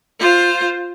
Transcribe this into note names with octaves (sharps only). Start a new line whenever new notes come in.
F4 C5